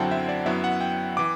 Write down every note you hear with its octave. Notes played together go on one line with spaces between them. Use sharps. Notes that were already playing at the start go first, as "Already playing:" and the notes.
Already playing: F#2 D3 F#3 C4 E4 F#5 G5 A5
E5
D5
F#2 F#3 B3 E4 E5
F#5
G5
E3 D6